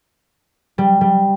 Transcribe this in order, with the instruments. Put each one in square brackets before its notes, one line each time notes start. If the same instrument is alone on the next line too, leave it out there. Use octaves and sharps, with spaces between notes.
[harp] G3
G3